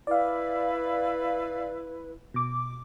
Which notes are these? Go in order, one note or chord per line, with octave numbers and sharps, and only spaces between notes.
E4 B4 D5 F5
B2 D6